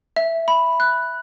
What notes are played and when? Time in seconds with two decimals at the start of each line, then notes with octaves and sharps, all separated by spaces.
0.16 E5
0.48 B5
0.80 F#6